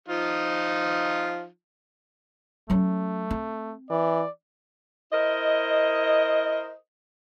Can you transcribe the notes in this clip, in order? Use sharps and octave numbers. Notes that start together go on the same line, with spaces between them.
F3 D#4 F4
F#3 A3 C#4
C4
E3 D5
E4 A#4 C5 D#5